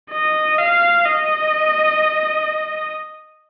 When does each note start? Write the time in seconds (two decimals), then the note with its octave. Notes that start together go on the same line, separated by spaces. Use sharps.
0.11 D#5
0.58 F5
1.05 D#5